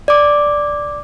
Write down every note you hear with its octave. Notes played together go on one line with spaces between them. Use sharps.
D5 D6